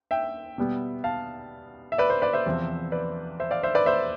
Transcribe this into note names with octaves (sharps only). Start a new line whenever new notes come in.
E5 G5
B2 G3 B3
F5 A5
E5
B4 D5
C5
B4 D5
C5 E5
E2 C3 F3 C4
B4 D5
C5 E5
D5 F5
C5 E5
B4 D5
C5 E5